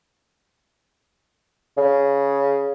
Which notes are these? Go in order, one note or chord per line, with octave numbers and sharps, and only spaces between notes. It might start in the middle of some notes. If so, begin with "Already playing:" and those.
C#3